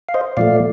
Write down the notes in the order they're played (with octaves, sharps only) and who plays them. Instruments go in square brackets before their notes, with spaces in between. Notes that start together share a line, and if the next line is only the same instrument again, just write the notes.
[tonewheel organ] F5
C5 D#5
A#2 F3 A3 D5 F5